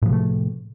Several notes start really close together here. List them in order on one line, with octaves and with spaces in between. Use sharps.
A2 F3 C3 A3